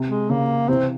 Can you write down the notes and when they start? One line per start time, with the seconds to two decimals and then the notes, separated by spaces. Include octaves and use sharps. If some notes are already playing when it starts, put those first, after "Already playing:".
Already playing: C3
0.10 G#3
0.30 C#3 A#3
0.68 C3 E3 C4